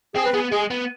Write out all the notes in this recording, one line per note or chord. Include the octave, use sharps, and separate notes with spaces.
C4 G#4
B4
B3 G#4
G#3 G#4
B3